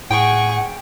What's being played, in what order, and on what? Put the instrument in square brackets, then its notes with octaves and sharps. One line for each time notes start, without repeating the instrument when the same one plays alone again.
[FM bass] A2 [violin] G#4 C#6 [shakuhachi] F#5 [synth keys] G5